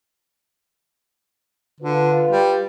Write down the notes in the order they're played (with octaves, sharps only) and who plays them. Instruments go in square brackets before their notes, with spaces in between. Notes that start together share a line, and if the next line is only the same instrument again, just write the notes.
[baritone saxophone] D3 [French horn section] F4 B4
[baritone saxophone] G3